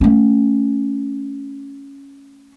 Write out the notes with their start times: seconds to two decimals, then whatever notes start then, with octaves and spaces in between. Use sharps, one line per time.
0.01 A3 C#4